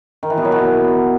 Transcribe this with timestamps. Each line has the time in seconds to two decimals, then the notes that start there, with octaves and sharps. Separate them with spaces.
0.23 D#3
0.30 E3
0.37 B2
0.45 F#3
0.52 B2